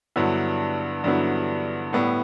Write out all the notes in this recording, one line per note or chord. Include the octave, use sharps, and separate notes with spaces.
G2 D3 F#3 B3 E4
G2 D3 F#3 B3 E4
A2 G3 B3 E4